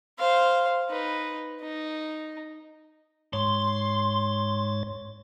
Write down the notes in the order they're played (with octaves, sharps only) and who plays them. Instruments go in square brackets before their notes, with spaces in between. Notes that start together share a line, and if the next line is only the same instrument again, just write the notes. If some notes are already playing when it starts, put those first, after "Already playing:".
[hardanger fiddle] C5 F5
D#4 B4
D#4
[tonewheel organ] G#2 C#5 A6 [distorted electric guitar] C6